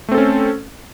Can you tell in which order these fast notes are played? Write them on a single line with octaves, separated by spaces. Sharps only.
A3 C4 A4 C#4